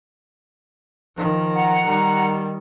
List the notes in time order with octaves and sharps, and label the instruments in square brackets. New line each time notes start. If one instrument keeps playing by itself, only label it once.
[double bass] D#3 F3
[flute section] F#5 A#5
[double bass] D#3 G3